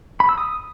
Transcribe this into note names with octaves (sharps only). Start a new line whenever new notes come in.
B5
E6
D#6